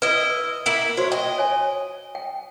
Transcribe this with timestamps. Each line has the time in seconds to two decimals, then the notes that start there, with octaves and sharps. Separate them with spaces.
0.02 E4 B4 D#5
0.66 A#3 E4 E5
0.97 F#4 C5 C#5 C6
1.12 D#5 G5
1.38 C#5 G#5
2.15 G5